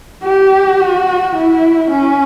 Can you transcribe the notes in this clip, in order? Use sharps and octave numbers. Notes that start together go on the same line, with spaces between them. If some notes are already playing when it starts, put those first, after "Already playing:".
G4
F#4
E4
C#4